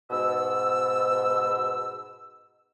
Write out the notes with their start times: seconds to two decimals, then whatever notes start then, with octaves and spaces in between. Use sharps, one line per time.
0.10 G#2 B2 E6